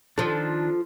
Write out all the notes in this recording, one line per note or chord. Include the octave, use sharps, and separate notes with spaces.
D#3 F3 D4 A4